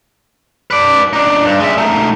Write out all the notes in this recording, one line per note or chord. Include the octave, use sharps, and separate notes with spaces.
B4 D5
D4 D#4
G2
G#3 E5
A3 D#4